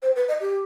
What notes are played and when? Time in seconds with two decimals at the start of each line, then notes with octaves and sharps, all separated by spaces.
0.02 C5
0.16 B4
0.28 D#5
0.41 G4